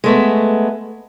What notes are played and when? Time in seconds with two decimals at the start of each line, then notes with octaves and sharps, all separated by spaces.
0.04 G#3 A3 B3